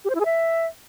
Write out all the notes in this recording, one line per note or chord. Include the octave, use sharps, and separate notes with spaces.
G4
C5
E4
G#4
E5